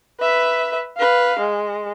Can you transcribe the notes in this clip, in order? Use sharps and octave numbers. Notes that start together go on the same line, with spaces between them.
B4 E5
B4 F5
G#3